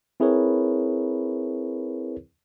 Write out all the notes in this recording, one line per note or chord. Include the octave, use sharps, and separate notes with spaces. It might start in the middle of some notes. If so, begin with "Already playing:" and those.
C4 E4 G#4 A#4 B4 C#5